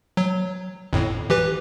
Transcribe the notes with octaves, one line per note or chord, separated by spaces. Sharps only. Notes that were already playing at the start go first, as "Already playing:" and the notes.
F#3
G1 F2 A2
E3 G4 B4